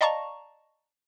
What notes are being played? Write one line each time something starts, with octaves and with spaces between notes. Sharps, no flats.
D5 D#5 F5 A5 A#5 C#6